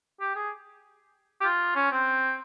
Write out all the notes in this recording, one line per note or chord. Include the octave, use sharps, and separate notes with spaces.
G4
G#4
G4
F4
C#4
C4